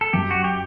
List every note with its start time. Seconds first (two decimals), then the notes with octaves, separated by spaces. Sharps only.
0.01 A4
0.13 F#2 G4
0.31 F#4
0.44 G4